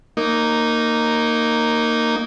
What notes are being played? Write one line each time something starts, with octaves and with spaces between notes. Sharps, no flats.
A#3 D#4